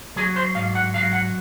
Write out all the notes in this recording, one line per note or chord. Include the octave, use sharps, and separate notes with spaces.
F#3 G#4
C5
G#2 F5
F#5
F#3 F5
F#5